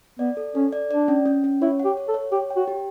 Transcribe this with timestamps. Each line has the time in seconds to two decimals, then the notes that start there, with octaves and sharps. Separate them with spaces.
0.19 B3 D5
0.37 A4
0.55 C#4 A4
0.73 D5
0.91 D4 D5
1.08 C#4
1.26 C#4
1.44 C#4
1.62 E4 C#5
1.80 G4 F#5
1.97 C#5
2.08 A4
2.14 C#5
2.32 G4 C#5
2.50 G5
2.56 F#4
2.68 G4